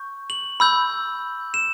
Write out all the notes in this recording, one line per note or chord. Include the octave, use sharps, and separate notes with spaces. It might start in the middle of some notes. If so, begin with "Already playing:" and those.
Already playing: C#6 G6
F#7
B5 E6 G6
E7